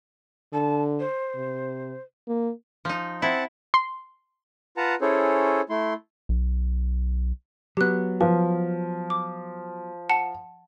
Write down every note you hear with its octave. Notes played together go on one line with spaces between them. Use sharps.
D3 A5
C5
C3
A#3
F3 D#4
C4 E4 F#5 A5
C6
F4 B4 F#5 A5 A#5
C#4 E4 G#4 A4 C5 C#5
A3 E4 C6
B1
F#3 B3 G4 F#6
F3 B4
D6
F#5 A5 C#7